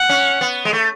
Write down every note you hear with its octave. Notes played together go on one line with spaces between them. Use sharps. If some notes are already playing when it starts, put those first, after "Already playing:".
Already playing: F#5
C#4
B3
G#3
A3